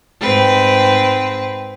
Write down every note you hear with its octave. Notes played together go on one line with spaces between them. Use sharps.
G#2 C4 B4